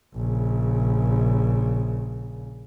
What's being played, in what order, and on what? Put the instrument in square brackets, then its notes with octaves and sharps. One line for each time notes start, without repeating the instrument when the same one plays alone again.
[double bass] A#1 C#3